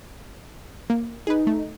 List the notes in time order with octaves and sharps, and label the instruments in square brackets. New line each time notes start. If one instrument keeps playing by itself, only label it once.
[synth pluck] A#3
[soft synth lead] D#4 [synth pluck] G#4 B4
[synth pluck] A3